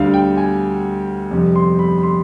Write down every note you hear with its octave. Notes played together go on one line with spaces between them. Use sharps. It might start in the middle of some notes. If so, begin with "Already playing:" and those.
Already playing: D2 D3 G3 F5
G5
G#5
F2 C3 G3
C6
B5
B5
C6